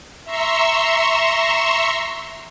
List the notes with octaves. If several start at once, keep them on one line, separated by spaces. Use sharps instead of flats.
E5 A#5 C6 C#6 E6